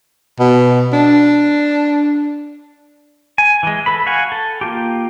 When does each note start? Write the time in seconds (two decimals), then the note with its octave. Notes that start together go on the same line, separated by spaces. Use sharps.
0.39 B2
0.93 D4
3.38 G#5
3.63 E3 G#3
3.86 A4 B4 B5
4.06 F#4 F5 F#5 G#5
4.32 A4
4.61 A#3 F4 G4